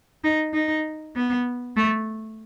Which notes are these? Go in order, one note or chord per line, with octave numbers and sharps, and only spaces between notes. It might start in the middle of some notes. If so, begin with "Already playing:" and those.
D#4
D#4
B3
A3